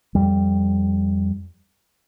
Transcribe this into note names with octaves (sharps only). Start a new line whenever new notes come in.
F2 G3